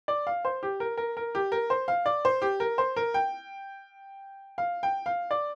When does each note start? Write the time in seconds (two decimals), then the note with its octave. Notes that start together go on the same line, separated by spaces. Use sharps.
0.08 D5
0.27 F5
0.45 C5
0.63 G4
0.80 A#4
0.97 A#4
1.17 A#4
1.35 G4
1.52 A#4
1.70 C5
1.88 F5
2.06 D5
2.25 C5
2.42 G4
2.60 A#4
2.78 C5
2.96 A#4
3.14 G5
4.58 F5
4.83 G5
5.06 F5
5.31 D5